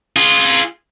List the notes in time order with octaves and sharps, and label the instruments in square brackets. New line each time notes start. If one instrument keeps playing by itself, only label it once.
[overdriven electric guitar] F4 G#4